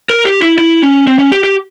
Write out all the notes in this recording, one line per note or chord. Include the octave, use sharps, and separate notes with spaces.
A#4
G4
E4
E4
C#4
C4
C#4
G4
G4